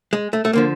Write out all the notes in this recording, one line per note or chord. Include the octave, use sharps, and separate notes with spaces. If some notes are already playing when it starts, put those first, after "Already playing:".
G#3
A3
A3
D3 F3 A#3